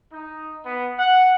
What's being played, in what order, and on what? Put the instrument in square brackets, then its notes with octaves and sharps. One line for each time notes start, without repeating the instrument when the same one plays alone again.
[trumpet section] D#4
B3
F#5